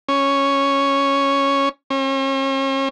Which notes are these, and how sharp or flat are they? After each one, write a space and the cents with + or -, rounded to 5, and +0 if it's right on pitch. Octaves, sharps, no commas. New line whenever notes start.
C#4 -5
C#4 -45